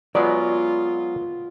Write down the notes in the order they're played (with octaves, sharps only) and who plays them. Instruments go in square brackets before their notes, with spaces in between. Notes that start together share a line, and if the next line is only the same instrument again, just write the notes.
[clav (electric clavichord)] F#3 G#3 B3 [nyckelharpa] F4 [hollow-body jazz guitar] D5